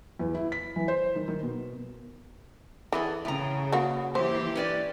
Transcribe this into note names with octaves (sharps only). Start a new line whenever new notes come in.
E2
E4
B6
E3
C5
D#3
D#3
B2
E3 B3 G#4 A4
A2 C#3 A#5
A#3 B3 F#4
E3 A#3 G4 C5
C#4 B4 D5